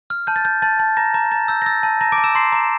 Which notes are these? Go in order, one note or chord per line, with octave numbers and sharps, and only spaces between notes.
F6
A5 G6
A6
G6
A5 A6
A5
A#5 A#6
A#5
A#5 A6
E6 G6
A#6
E6 A6
A5
A5 A#5 A#6
D6 D7
A5
E6 E7
A#5 C6 C7
A#5